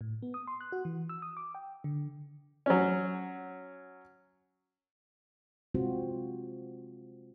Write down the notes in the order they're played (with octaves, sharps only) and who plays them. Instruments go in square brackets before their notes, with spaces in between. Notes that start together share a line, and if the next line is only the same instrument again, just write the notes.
[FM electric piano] A2
B3
D#6
C6
F#6
F#4
E3
E6
D#6
D6
G5
D3
[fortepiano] F#3 C#4
[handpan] C3 G#3 C4 F4 F#4 C5